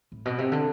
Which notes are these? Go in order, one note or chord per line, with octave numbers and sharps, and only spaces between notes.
A2
B2
C3
D3